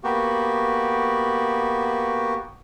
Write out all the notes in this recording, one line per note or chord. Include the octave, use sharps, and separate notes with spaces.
A#3 B3 F#4 G4